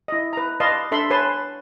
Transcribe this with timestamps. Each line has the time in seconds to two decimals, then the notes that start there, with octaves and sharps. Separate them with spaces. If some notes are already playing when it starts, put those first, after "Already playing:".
0.08 E4 D#5
0.33 B4 A#5
0.60 B4 D5 D#5 F5 A5 C6
0.91 D4 A4 E5 B5 C6
1.11 B4 C#5 G#5 A5 C6